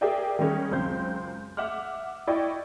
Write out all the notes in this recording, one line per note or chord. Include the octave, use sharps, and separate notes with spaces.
G4 G#4 A#4 D5 E5 G5
D#3 G3 C#4 G#4
C#2 F#2 C4 C5 G6
E5 F#5 D6 F6
E4 D5 D#5 G5 C#6